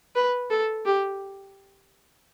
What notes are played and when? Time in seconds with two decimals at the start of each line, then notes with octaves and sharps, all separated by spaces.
0.16 B4
0.51 A4
0.85 G4